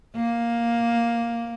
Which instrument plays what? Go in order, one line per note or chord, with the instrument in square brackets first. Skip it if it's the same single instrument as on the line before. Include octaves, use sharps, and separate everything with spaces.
[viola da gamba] A#3